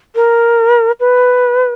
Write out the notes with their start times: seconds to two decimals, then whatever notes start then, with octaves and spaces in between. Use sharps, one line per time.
0.15 A#4
1.00 B4